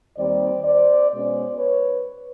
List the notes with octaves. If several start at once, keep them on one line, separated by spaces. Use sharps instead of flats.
D#2 D#3 G3 C4 C5 D5
C5 D5
B2 G#3 C#4 C5 D5
B4 C#5